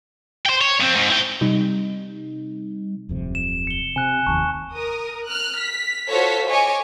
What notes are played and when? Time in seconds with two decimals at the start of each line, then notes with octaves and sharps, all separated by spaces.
0.46 C5 G5
0.61 C#5
0.80 F2 C4
0.95 G#2
1.10 E4 G5
1.41 C3 G3 D#4
3.09 D1 F2 C3
3.35 E7
3.67 C#7 G7
3.96 C3 G#5 F#6
4.27 F1 D#2 A5 C#6
4.73 A#4 D#6
5.26 F6 F#6
5.58 B6
6.09 F4 F#4 A4 C5 C#5 B6
6.48 C#5 D#5 G#5 C#6 D6